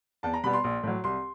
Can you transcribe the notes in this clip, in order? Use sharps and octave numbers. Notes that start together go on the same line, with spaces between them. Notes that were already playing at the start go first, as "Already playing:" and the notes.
E2 A5
A#5
B2 G3 B3 B5
C6
A#1
A2 F#3
C2 C6